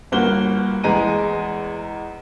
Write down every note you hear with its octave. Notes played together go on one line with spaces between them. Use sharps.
G1 G2 A#3 F#4 G7
E2 G#3 A#5 D#7